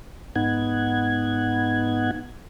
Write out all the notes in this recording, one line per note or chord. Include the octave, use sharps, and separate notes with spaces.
G#2 B3 D#4 F#5 G#6